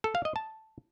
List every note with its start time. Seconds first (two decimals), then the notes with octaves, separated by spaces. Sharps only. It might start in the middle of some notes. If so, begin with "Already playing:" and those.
0.04 A4
0.15 F5
0.25 D#5
0.36 A5